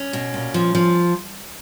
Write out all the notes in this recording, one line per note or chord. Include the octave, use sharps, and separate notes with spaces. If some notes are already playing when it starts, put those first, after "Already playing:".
Already playing: C#4
B2
A#2
F3
F3